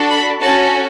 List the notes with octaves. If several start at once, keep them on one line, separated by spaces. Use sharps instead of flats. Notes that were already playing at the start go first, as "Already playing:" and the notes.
Already playing: D4 F#4 A4
B5
C#4 F#4 A4 A5